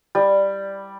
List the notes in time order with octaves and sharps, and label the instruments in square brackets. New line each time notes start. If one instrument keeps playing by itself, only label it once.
[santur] G3